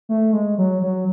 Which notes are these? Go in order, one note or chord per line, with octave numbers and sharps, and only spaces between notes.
A3
G#3
F#3
F#3